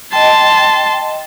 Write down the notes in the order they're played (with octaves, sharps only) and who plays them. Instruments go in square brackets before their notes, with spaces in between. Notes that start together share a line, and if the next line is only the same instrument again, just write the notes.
[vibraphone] D#5 G5 [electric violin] A5 C6